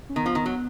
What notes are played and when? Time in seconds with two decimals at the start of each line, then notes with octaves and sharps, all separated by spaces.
0.09 C#4
0.16 D#3 B3
0.26 F3
0.35 D#3
0.46 F#3